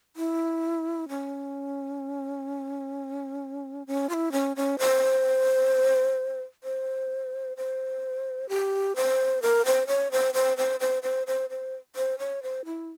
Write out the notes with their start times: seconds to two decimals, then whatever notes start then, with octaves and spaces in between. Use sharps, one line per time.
0.16 E4
1.09 C#4
3.87 C#4
4.09 F4
4.14 E4
4.32 C#4
4.56 C#4
4.79 C5
6.64 C5
7.57 C5
8.49 G4
8.96 C5
9.42 A#4
9.65 C5
9.87 C#5
10.12 C5
10.34 C5
10.58 C5
10.80 C5
11.03 C5
11.27 C5
11.50 C5
11.96 C5
12.19 C#5
12.43 C5
12.65 E4